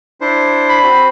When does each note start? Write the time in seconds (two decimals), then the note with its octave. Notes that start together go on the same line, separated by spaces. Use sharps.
0.21 D4 E4 C5
0.69 B5
0.83 C4 F#4 C5